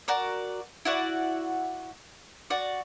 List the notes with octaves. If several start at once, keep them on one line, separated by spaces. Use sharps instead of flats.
F#4 A#4 D5
E4 F#4 D5 F#5
F#4 D5